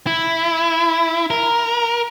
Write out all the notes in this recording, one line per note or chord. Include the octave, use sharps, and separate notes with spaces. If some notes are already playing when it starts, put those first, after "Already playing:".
E4
A#4